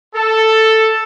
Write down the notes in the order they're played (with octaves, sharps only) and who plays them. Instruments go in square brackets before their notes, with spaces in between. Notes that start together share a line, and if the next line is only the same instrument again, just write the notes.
[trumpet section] A4